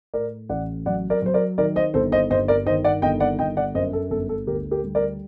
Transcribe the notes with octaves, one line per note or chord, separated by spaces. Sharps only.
A2 A#4 D5
A1 D5 F#5
F#3 D5 F#5
A#4 D5
F#3 C5
A#4 D5
D#3 A#4 D5
C5 D#5
G1 A4 C5
C5 D#5
G2 C5 D#5
A#4 D5
D#3 C5 D#5
D5 F#5
G1 D#5 G5
D5 F#5
G1 D#5 G5
D5 F#5
F#2 C5 D#5
A4
G1 A4
A4
D2 G4 A#4
G4 A#4
G3
A#4 D5